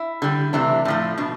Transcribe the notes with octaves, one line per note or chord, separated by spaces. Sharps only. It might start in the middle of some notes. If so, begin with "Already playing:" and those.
Already playing: E4
D3 G3
C3 E3 A3 D4
A2 F3 A3
B2 D4